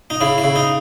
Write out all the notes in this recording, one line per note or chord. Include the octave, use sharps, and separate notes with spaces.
D#4
C#3 E4
E4
C#3
D#4